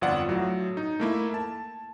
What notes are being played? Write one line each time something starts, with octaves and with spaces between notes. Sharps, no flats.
G1 F2 F4 D5 F#5
A2 F#3
D#4
A3 A#3 E4
A5